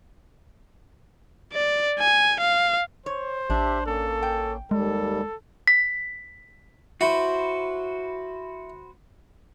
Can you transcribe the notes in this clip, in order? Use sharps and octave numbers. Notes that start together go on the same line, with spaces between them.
D5
G#5
F5
C5 C#5
A1 D4 G4 E5
A#3 C#4 A4
G5
D#2 G3 G#3 A4
B6
E4 F#4 B4 C5